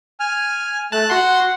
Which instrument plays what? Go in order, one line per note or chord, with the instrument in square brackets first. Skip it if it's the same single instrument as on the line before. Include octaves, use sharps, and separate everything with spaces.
[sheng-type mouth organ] G#5 F6
[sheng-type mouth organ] A3 [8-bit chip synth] A5 F#6
[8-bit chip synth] F#4 C6 [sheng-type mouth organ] F#5